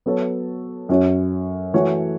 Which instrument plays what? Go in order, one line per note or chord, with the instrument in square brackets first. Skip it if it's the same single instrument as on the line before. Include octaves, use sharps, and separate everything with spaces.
[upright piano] F#3 B3 A4 C#5
F#2 F#3 C#4 F#4 C#5
E3 A3 F#4 C#5